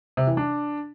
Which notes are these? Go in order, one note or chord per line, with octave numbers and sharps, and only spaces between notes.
C3
E3
D4